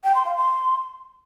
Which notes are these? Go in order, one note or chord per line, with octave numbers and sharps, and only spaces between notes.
G5
C6
F5
C6